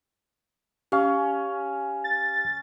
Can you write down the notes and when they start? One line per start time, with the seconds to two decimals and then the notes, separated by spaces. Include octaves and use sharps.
0.92 C#4 G4 F5
2.04 A6